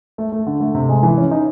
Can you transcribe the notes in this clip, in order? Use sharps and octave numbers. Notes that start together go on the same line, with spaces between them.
A3
A3
D3
A3
C3
G#3
E3
C#4
D#4